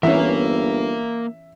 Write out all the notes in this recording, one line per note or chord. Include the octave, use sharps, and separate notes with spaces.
G1 E3 A#3 C#4 A#4 E5